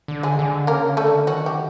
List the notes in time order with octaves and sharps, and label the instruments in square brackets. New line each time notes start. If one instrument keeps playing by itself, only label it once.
[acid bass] D3
[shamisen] G#3 G#4
[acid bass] D3
[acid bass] C#3 [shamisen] A#3 A#4
[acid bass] D3 [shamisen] A3 A4
[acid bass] D#3 [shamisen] F#3 F#4
[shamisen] G4